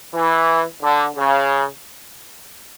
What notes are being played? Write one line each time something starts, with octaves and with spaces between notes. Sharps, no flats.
E3
D3
C#3